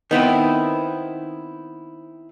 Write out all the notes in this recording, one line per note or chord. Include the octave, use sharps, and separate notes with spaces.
D#3 B3 C4 E4